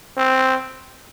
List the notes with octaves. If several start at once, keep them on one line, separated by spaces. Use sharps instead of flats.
C4